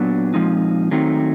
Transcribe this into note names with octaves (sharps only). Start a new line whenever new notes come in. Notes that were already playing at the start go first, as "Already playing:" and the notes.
Already playing: A#2 F#3 B3 D4
A#2 F3 G#3 C4 D#4
D#3 F#3 A3 C4 D#4